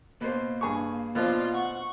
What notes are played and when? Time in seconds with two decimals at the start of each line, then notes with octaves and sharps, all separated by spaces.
0.21 B2 A#3 C5
0.61 G2 G#4 C#6
1.15 B2 F3 C4 F4 D5
1.52 F#5 C#6